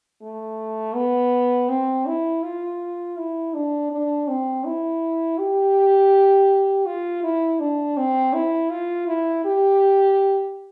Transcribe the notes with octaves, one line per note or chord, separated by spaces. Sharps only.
A3
B3
C4
E4
F4
E4
D4
D4
C4
E4
G4
F4
E4
D4
C4
E4
F4
E4
G4